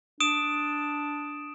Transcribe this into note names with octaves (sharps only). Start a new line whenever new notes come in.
D4 D#6 D7 E7